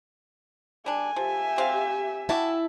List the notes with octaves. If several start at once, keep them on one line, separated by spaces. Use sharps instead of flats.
G3 D4 G#5
F3 G4 E5
F3 C4 F5
G3 E4 F#4 G4 E5 A5